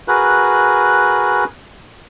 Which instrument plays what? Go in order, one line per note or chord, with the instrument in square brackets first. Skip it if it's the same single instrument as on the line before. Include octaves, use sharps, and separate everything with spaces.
[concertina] F#4 G#4 A#4 B4 F#6